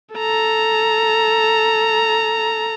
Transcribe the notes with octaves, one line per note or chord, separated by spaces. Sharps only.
A4 A#5